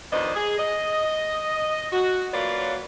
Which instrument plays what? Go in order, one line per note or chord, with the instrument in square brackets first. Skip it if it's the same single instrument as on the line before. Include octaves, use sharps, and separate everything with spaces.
[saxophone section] F2 D#3 B3 D4 C5 D#5
G#4
D#5
F#4
F#3 A#3 F4 B4 C#5 D5